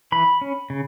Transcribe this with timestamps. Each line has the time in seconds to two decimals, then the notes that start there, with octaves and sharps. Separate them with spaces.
0.12 E3 B5
0.41 C#4
0.70 C#3